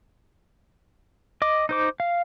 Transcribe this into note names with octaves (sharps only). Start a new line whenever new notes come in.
D#5 D6
D#4 C5 D6
F5